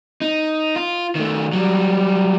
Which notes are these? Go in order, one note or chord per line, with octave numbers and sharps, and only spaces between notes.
D#4
F4
D#3 A3
F#3 G3